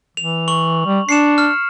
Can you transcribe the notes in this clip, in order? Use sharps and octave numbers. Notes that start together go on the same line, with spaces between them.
E3 F7
C#6 F#7
G3
D4 C7 C#7 E7
F6